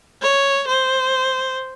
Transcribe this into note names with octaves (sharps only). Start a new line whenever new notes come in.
C#5
C5